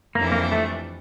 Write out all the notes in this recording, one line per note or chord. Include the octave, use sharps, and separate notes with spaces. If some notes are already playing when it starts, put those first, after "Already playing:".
F2 E3 G3 A#3 D4
A#3
A3